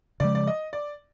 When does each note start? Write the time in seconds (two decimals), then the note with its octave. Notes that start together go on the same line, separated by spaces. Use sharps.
0.20 C#3 F3 G#3 D5
0.35 D5
0.47 D#5
0.73 D5